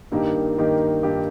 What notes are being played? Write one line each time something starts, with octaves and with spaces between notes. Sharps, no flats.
G2 D#3 A#3 D#4 G4
G2 D#3 A#3 D#4 G4
G2 D#3 A#3 D#4 G4